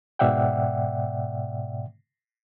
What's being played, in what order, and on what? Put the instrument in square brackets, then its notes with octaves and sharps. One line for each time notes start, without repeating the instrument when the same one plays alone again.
[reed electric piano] G#2 B2 D5 E5 F#5 G5